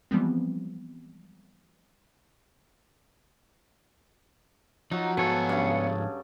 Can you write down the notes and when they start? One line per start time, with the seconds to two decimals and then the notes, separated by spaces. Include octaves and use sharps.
0.11 E3 F3 G3 G#3 B3 C4
4.91 F3 F#3 D#4
5.17 G#2 F3 B3 F#4 G#4 A4 C#5 F5
5.49 G2 C#3